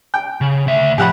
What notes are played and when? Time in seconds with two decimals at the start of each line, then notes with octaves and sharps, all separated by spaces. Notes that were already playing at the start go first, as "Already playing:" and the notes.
0.14 G5
0.41 C#3
0.67 D2 E5
0.98 A2 F3 G4 F#5 B5